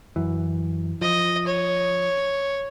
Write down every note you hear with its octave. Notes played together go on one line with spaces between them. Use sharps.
F#2 E3
F3 D#5
C#5